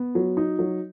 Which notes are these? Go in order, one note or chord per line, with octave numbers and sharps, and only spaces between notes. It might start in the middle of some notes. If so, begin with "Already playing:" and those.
Already playing: B3
F#3
D#4
F#3